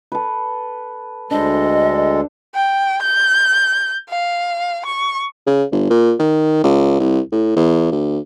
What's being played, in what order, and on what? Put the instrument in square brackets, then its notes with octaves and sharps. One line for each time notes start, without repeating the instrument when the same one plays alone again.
[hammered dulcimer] A4 B4
[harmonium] D2 G#3 A4 [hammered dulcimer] D4 C5 [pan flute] D#5
[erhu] G5
G6
F5
C#6
[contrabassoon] C#3
G1
A#2
D#3
C#2
C2
A2
E2
D2